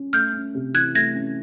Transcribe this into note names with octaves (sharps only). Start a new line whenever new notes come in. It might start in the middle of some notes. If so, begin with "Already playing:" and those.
Already playing: C#4
A3 F6 G6
C#4
C3
E3 F#6 G#6
A3 G#6 A#6
C#4